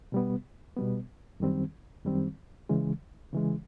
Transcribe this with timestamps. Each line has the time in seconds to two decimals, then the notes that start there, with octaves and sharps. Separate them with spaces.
0.12 B2 G3 B3
0.77 B2 G3 B3
1.40 F#2 D#3 G3 C4
2.05 F#2 D#3 G3 C4
2.69 C#3 E3 G#3
3.33 C#3 E3 G#3